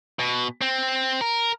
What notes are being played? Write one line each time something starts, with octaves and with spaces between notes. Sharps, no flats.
B2
C4
A#4